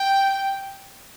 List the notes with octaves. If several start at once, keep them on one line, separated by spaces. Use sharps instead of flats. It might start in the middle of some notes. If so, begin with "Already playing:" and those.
Already playing: G5